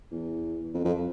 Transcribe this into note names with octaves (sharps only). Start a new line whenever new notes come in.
E2
F2
F2